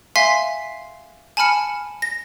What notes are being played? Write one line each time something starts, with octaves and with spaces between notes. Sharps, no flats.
E5 F5 G#5 C6 B6 C7
G#5 A5 B5 F6 C#7
A#6